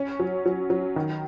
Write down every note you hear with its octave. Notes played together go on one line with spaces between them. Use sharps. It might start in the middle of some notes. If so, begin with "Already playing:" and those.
Already playing: C#4
F#3
F#3
F#3
D#3